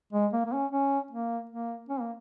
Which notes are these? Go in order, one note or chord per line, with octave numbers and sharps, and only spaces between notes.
G#3
A#3
A#3
C#4
C#4
A#3
A#3
C#4
A#3